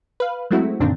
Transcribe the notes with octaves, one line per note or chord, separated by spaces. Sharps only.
B4 F5
F#3 G#3 A3 C4 E4 F#4
F#2 A#2 D3 D#3 C4 D4